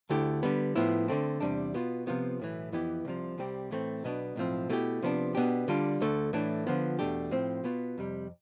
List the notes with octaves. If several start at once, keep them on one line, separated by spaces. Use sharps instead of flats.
D2 D3 A3 E4 G4
D3 G3 B3
A2 F3 B3 E4
D3 A3 C4
E2 C3 G3 D4
B2 B3 F4
C3 F3 B3 F4
B1 A2 E3
F2 E3 B3 E4 G4
C2 C3 F3
C2 C3 G3 C4 G4
A2 E3 A3 C4
B1 B2 B3 D4
B1 A2 F3 C4
B2 A3 E4 G4
C3 F3 B3 D4
B2 B3 D4 G4
D3 G3 D4 F4
D2 D3 A3
A2 E3 A3 D4
D3 F3 B3 F4
E2 B2 A3 D4 G4
A2 F3 C4
B2 B3 F4
F2 C3 G3